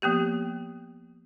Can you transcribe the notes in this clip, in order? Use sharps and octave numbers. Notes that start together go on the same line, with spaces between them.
F3 A#3 B3 G4